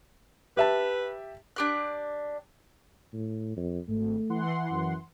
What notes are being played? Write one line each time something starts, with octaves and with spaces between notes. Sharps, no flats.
G4 B4 E5 A5
D4 G4 F#6
A2
F2
G#1 A3
E3 F#5 C6
F#2